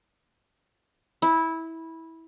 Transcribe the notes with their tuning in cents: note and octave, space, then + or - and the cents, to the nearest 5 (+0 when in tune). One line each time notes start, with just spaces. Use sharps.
E4 -15